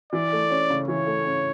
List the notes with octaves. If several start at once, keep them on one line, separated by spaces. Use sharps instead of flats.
E3 D5
A3
C#4
C#3
E3 C#5
A3
C#4